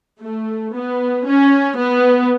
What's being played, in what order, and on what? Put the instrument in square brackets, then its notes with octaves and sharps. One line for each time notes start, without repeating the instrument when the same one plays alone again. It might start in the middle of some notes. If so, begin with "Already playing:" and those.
[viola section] A3
B3
C#4
B3